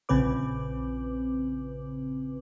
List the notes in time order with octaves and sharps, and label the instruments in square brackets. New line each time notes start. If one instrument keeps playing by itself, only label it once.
[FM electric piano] A#1 C#3 C4 B4 D6